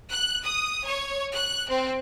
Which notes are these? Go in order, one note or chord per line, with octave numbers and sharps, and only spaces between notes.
F#6
D#6
C#5
F#6
C4